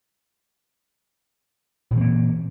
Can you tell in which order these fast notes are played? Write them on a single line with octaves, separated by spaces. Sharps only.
A#2 E3 C4 A#3